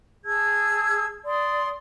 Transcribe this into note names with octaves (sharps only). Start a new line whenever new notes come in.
G#4 A5 E6 G#6
D5 C6 D#6